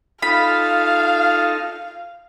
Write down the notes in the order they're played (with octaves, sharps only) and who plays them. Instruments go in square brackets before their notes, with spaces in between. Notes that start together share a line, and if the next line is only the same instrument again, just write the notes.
[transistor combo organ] D#4 F4 A4 [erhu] F5 [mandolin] B5